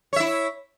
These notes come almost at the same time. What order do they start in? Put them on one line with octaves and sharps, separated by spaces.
C#5 E5 E4